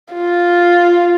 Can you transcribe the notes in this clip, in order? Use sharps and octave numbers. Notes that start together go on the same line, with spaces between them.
F4